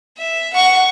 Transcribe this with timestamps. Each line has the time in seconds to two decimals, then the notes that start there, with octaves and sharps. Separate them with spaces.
0.17 E5
0.53 F#5 C#6